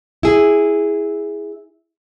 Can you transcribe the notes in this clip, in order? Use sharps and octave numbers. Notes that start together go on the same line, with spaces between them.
E4 G#4